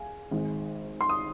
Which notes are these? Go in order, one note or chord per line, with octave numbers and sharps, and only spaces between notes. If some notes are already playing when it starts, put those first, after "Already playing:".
Already playing: G#4 F5 G#5
G#1 G#2 G#3
C6
D#6